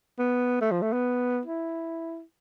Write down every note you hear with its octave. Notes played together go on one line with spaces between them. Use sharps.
B3
A3
F3
A3
B3
E4